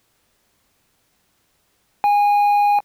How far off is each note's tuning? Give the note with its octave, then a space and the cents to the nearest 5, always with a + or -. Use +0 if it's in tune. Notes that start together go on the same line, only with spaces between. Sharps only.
G#5 -20